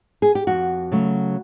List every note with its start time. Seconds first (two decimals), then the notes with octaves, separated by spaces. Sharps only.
0.22 G#4
0.35 G4
0.47 F2 F#4
0.92 C#3 F#3 A3